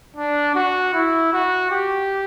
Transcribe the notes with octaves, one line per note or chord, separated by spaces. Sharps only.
D4
F#4
E4
F#4
G4